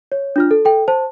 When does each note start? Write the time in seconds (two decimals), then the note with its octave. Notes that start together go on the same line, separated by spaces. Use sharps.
0.12 C#5
0.36 D4 F4 F6
0.51 A4
0.65 A4 G5
0.88 C5 A5